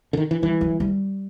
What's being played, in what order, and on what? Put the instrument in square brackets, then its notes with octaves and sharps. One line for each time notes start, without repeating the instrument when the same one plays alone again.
[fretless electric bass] D3
D#3
E3
[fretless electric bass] E3 [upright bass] G3
[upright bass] F#3
G3